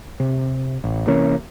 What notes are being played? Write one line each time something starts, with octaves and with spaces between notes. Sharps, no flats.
C3
A1
C3 E3 A#3 C#4